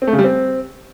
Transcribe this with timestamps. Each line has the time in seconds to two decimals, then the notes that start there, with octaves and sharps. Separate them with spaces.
0.02 C4
0.07 A3
0.13 C#3
0.19 G3
0.24 C4